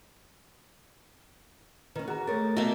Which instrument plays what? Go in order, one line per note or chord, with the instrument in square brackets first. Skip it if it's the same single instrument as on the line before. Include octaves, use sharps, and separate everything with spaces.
[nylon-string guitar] D#3 C#4 [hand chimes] B4
[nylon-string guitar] F#4 [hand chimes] G#4 A#5
[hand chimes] A3 A4 A6 [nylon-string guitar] A#4 C#5
[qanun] B2 A#3 [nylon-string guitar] A#4 E5 [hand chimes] A5